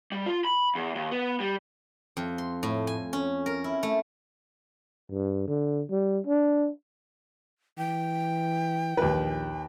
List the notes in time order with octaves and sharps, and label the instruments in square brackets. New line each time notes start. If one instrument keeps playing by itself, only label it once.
[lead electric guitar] G3
F4
B5
E2
D#2
B3
G3
[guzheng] F2
C6
A2
G#5
C#4
A#4
E4
A3
[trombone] G2
D3
G3
D4
[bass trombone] E3 [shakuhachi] G5
[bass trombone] A#1 [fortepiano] D#2 B4